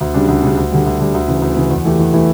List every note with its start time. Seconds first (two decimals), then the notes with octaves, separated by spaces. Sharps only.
0.01 D2
0.14 C#3 G3 D4
0.28 D2
0.43 C#3 G3 D4
0.57 D2
0.71 D3 G3
0.86 D2
1.00 D3 G3
1.14 D2
1.28 C#3 E3
1.42 D2
1.57 C#3 E3
1.70 E2
1.85 E3 A3 E4 G4
1.99 E2
2.13 E3 A3 E4 G4